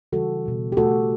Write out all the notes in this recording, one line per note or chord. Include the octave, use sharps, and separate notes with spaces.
C#3 E3 G3 F#4 A4
B2 G3
G4
B2 A3 F#4 A4